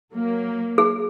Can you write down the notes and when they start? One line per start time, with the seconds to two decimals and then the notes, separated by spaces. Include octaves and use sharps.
0.13 F#3 A#3
0.78 G#4